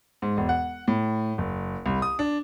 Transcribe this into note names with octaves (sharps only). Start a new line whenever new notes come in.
G#2
E1
F#5
A2
F#1
C2
D#6
D4